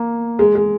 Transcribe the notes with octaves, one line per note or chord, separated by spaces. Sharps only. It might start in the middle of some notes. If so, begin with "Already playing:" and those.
Already playing: A#3
G#3
G#3